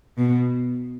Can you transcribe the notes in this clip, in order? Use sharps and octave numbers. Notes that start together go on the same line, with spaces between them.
B2